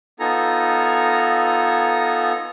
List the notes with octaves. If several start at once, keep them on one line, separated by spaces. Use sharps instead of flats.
B3 D#4 F4 A4 G#5 A#5